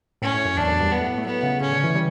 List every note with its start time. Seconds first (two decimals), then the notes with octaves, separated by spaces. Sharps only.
0.22 A2 C#4
0.34 A2
0.45 F#2
0.57 E2 D4
0.68 F#2
0.80 G2
0.92 B3
1.00 A2
1.18 A3
1.25 F#3 B3
1.43 C#3
1.60 C#3 C#4
1.72 D3
1.84 E3
1.95 G3